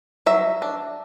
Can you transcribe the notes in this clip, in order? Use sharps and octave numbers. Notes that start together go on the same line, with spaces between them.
F#3 E5
D4